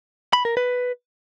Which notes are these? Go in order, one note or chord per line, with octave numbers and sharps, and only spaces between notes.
B5
A#4
B4